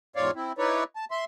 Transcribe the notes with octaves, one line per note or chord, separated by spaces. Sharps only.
E2 G#2 F4 C#5 D5 F5
C4 E4
D#4 E4 B4 C#5 D5
A5
E5 C6